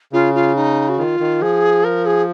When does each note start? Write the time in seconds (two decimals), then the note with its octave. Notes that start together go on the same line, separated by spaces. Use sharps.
0.13 C#3 F4
0.34 F4
0.55 D#4
0.89 F#4
0.98 D#3 F4
1.20 D#3
1.41 F3 G#4
1.84 A#4
2.05 G#4